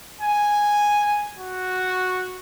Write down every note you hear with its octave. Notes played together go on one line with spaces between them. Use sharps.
G#5
F#4